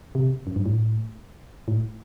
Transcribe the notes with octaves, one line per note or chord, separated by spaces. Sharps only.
C3
F#2
G2
A2
A2